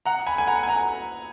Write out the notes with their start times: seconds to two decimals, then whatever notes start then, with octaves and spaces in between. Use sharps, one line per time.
0.06 F#5 A#5
0.27 G#5 B5
0.38 G#5
0.47 F#5 A#5
0.63 G#5
0.68 F#5 A#5